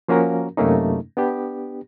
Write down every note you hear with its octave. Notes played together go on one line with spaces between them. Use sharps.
F3 A#3 C#4 F#4 A#4
F#2 C3 A3 A#3 C#4 D#4
B3 D4 G4